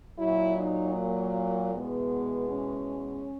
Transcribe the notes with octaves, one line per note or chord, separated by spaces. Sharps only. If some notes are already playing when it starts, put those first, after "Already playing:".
A#2 F#3 E4
D#4
A#3
E2 B2 G#3 B3
C#4